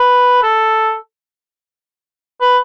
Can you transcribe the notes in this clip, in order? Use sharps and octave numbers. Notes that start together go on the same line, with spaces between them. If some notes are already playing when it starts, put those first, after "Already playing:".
Already playing: B4
A4
B4